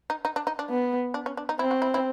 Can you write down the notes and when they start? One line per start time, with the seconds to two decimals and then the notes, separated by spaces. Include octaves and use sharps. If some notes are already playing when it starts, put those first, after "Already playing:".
0.10 D#4
0.25 D#4
0.36 D4
0.47 D#4
0.59 D4
0.70 B3
1.14 D4
1.26 C#4
1.37 D4
1.49 D#4
1.59 C4 E4
1.71 F#4
1.82 E4
1.94 E4